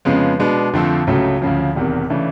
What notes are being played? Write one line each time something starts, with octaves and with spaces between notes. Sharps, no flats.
F2 C#3 F3 G#3 B3
B2 G#3 B3 D4
F2 D3 F3 A3 C4
C#2 C#3 F#3 A3
D2 C#3 F3
E1 E2 C3 D#3
C#3 E3 A3 D4